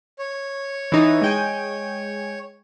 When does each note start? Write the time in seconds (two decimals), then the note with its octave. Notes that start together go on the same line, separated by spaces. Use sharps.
0.19 C#5
0.92 E3 D#4
1.22 G#3 G5 G#5